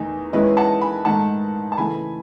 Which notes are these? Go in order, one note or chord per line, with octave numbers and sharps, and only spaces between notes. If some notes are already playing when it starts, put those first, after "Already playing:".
Already playing: E2 D#3 A3 D#4
D#3 G#3 C#4 E4 B4 D#5
F#5 A5
G#5 B5
G#2 D#3 A3 D#4 F#5 A5
A5
C#3 E3 A3 G#5 B5